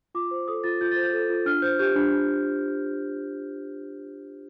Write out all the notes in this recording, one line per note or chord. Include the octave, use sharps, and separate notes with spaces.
F4 D6
C5
A4 D#6
F4 A6
F4 G6
C5 A6
G6
A4
F4
D4 F6
C5 G6
G4 G6
D4
D4